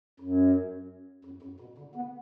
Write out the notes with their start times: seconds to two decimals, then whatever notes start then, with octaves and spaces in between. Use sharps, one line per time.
0.20 F#2
1.25 F#2
1.43 F#2
1.60 B2
1.78 D3
1.95 B3